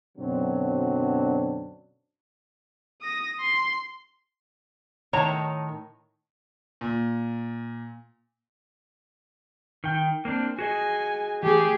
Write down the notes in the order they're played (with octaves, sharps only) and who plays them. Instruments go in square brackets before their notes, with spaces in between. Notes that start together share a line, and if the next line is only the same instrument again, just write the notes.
[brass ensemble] F#2 B2 D3 F#3 C4 D4
[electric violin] D#6 A#6
C6
[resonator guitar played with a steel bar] A2 D#3 C#5 A5 A#5
[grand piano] A#2
[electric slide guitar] D#3 G5
A#3 C4 D4
[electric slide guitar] F#4 G#4 D#5 [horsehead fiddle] G#5
[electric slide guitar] E3 A3 [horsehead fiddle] G4 G#4